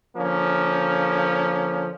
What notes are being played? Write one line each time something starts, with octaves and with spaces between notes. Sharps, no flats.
D3 F3 A#3 C#4